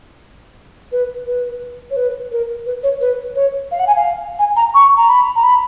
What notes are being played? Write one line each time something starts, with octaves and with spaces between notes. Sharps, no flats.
B4
B4
C#5
B4
A#4
B4
C#5
B4
C#5
F5
F#5
G#5
F5
G#5
A#5
C#6
A#5
B5
A#5
B5